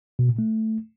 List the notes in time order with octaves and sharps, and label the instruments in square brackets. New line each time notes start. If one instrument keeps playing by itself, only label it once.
[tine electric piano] B2
A#2
A3